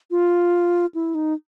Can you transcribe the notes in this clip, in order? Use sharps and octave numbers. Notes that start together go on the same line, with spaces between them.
F4
E4
D#4